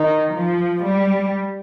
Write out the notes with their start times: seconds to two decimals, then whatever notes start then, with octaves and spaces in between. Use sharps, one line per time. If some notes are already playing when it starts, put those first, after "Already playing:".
Already playing: D#3 D#4
0.34 F3
0.83 G3